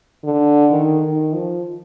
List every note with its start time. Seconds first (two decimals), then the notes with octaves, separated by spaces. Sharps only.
0.24 D3
0.71 D#3
1.02 D#3
1.34 F3